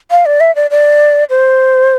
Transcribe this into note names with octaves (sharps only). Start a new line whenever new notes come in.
F5
D5
E5
D5
D5
C5